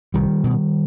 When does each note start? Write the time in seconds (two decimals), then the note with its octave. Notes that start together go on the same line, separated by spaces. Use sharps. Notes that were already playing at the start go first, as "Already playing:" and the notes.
0.14 C2 D#3 G3
0.44 B2